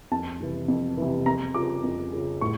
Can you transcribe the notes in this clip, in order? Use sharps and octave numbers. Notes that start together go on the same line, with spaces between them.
F2 A5
C3 E3
F2
C3 E3
F2 A#5
C#3 F3 D6
F2
C#3 F3
A2 C#6